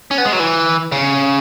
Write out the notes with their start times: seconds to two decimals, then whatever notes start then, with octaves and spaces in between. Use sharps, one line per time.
0.11 C#4
0.18 B3
0.25 G#3
0.33 F#3
0.40 E3
0.92 C#3